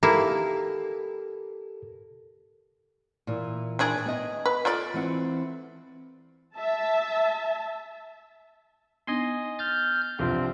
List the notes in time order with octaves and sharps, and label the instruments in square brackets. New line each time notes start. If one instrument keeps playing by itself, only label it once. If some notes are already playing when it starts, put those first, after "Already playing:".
[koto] A#3 D#4 E4 [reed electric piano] G4 A4 A#4
[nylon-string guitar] A#2 E3
[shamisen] D#3 D4 G#4
[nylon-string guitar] B3 D#5
[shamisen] B4
F4 A4 D5
[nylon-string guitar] E3 C4 F#5
[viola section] E5 A5
[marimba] B3 D4 D#4 [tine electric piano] D#5 G#5 C6
[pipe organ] F6 G6 [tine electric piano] A6
[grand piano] C2 G2 F3 [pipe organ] C4